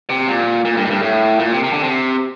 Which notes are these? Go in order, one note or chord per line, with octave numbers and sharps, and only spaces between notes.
C3
A#2
A#2
G2
A2
G2
A2
A#2
C3
C3
D3
C3